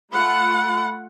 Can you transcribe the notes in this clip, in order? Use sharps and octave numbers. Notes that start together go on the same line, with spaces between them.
A3 F4 F#5 B5